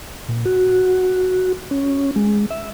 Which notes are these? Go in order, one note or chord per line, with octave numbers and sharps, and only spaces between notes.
A#2
F#4
C#4
G#3
E5